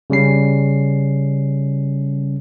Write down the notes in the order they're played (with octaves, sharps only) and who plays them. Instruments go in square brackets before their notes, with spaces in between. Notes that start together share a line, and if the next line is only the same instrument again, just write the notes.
[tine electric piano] C#3 G3 C#4 C7